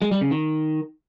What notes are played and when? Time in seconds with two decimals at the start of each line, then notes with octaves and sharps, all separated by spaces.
0.02 G#3
0.11 G3
0.21 C#3
0.31 D#3